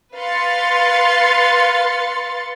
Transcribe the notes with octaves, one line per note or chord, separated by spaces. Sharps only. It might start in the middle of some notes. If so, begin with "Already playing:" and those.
B4 F5 C6 A6 C#7